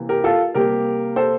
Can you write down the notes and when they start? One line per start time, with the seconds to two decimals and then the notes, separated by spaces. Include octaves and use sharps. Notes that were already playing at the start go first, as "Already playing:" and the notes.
Already playing: C3 E3 A#3
0.09 G4 A#4
0.24 F4 A4
0.55 C3 G3 A#3 G4 A#4
1.16 A4 C5